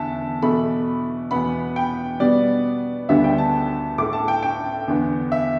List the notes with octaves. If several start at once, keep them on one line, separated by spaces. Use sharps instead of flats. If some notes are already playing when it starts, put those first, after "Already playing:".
Already playing: E2 D3 E5 A5
E2 B2 A3 B5
E2 B2 B3 B5
G5
B2 G3 B3 D5
D2 D3 G3 B3 E5
G5
A5
A2 A3 D6
A5
G5
G5
E2 D3 B3
E5